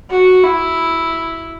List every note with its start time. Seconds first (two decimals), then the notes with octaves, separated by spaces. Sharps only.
0.11 F#4
0.44 E4